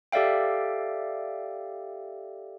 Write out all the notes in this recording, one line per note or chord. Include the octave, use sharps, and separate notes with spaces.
G4 A4 D5 E5 F5 G5